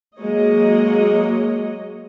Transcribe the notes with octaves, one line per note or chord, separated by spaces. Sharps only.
F#3 G#3 A#3 C#5 D#5